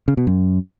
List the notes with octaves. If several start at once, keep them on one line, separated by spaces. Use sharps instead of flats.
C#3
B2
F#2